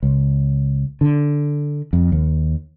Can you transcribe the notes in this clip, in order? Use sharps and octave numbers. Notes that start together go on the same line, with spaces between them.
C#2
D3
F2
D#2